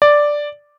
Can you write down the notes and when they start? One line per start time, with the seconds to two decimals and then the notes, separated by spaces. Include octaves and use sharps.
0.02 D5